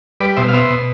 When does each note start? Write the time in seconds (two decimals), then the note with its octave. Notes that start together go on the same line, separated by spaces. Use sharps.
0.21 G3 B4 D5
0.37 B2 C5 E5
0.48 F5
0.53 B3 C5 E5
0.70 B2